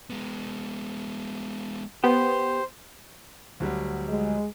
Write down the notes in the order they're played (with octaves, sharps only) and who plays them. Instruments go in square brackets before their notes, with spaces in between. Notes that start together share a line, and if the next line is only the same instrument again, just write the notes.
[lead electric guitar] G#3 B3
[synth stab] B3 [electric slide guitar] G4 [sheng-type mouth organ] C5
[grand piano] D2 F#3 G3
[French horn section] G#3